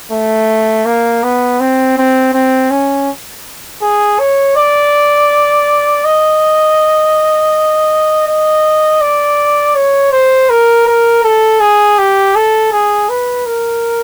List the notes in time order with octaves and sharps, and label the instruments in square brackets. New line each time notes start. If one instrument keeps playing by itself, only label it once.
[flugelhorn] A3
A#3
B3
C4
C4
C4
C#4
G#4
C#5
D5
D#5
D#5
D5
C#5
C5
A#4
A#4
A4
G#4
G4
A4
G#4
B4
A#4